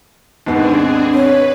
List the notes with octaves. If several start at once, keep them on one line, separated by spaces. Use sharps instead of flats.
D#2 G#2 B3 C4 D4 G#4
B4 C#5